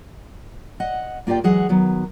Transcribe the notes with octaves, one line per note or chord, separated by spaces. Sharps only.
D#5 F#5
A#3 F4 G4 D5 G5
E3 F#3 G#3 G#4 F#5
D#3 F#3 B3